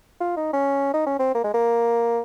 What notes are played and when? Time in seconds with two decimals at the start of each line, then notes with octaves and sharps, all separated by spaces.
0.20 F4
0.37 D#4
0.53 C#4
0.94 D#4
1.06 C#4
1.19 C4
1.35 A#3
1.44 G#3
1.54 A#3